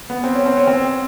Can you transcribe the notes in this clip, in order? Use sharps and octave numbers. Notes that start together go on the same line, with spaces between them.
B3
C4
C#4
C4
C#4
C4